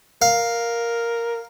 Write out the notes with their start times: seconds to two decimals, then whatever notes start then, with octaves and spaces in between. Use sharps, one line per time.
0.22 A#4 F5